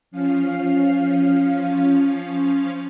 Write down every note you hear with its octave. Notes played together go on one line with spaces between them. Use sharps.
F3 C#4 F5